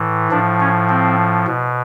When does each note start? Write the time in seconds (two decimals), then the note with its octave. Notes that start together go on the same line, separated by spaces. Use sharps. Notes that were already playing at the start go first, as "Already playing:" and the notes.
Already playing: A2 E3
0.31 A2 F3 D4
0.60 C#4
0.89 C4
1.47 B2